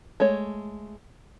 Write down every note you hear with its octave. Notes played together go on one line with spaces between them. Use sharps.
G#3 A3 C#5